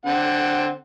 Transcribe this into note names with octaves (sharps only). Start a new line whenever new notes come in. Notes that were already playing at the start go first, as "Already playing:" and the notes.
D3 C4 F#5